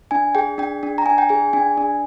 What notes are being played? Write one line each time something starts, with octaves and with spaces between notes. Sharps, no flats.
D4 G#5
G#4 G5
D4 G5
D4
A#5
D4 G#5
G5
G#4 G#5
D4 G#5
D4